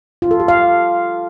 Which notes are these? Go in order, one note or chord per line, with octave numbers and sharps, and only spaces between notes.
F4
A4
G4
F5